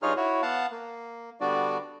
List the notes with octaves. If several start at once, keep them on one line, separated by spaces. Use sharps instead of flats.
G2 D#4 F4 G#4 C#5 F6
E4 F#4 C#5
B3 F5 F#5 A5
A#3
D3 G3 B3 D4 F#4 D5